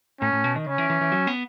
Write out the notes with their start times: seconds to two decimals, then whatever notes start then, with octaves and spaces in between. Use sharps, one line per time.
0.21 A2 C#4
0.33 A2
0.44 B2
0.56 D#3
0.67 C#3 C#4
0.78 E3
0.90 E3
1.01 E3
1.12 F#3
1.27 B3